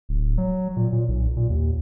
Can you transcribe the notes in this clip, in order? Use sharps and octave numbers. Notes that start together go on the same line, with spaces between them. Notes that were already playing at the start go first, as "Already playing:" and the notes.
D1
F#3
A#2
A#2
B1
A#2
D#2